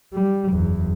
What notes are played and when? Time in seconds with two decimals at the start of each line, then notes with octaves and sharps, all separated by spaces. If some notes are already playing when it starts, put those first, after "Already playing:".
0.13 G3
0.50 F#1 E2